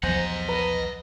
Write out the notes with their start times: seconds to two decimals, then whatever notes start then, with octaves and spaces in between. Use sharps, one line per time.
0.03 B1 E2 F3 G#4 C5 D#5 F#5 A#5
0.49 B4 A#5